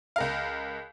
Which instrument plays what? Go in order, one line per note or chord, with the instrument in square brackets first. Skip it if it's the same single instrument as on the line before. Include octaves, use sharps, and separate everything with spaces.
[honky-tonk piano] C#2 A#4 F5